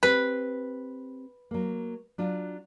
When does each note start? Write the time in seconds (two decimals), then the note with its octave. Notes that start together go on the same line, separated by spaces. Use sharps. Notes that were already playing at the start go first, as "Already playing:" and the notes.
0.03 C4 G4 B4 C5
1.51 F#3 A#3
2.18 F#3 D4 F4